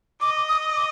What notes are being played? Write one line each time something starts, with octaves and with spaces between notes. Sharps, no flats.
D#5 D6
D#6
D6